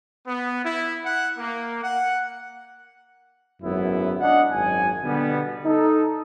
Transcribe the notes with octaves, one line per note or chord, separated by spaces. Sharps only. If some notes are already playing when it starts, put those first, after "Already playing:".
B3
E4
F#5
A#3
F#5
G#1 F#2 B3 E4
D4 D#5 F#5
G#1 F#2 G#5
B2 D3 G3 B3
D#4 A4